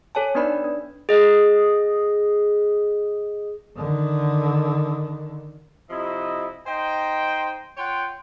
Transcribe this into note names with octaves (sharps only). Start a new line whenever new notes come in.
A4 C#5 G#5 A5
B3 D4 D#4 B4 D5 B5
D4
G#4 D#5
D3 D#3
C3 F3 E4 D#5
D#4 C5 D#5 G5
F4 C#5 F#5 G5